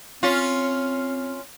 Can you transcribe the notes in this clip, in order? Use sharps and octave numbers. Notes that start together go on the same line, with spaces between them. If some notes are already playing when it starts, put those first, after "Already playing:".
C4 C#4 F4